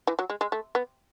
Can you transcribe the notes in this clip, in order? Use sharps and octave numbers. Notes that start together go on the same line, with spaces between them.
E3
F#3
G#3
G#3
A3
B3